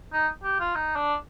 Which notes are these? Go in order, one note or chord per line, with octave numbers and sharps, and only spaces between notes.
D#4
G4
F4
D#4
D4